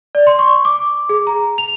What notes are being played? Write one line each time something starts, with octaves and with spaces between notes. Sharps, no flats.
D5
C6
C#6
D6
G#4
A#5
F7